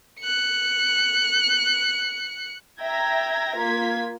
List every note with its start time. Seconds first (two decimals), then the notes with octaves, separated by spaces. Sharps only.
0.21 F#6 C#7
2.81 E5 G5 A#5 G#6 A#6
3.58 A#3 F4 G#6 B6